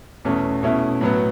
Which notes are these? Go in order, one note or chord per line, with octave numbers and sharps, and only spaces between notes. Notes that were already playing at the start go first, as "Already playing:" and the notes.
E2 B2 A3 C#4
B2 A3 C#4 E4
A2 F#3 B3